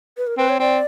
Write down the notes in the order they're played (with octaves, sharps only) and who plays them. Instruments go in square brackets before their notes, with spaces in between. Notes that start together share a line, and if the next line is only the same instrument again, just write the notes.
[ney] B4
A#4
[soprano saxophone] C4 [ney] B4
[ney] C#5
[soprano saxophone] C4 [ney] D5